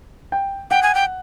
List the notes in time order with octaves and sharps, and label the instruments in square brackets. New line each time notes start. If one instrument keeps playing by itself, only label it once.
[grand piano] G5
[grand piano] F#5 [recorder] G5
[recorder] G#5
G5